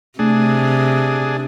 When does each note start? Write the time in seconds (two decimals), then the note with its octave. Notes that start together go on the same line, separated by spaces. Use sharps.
0.19 C3 A3 D4 G#4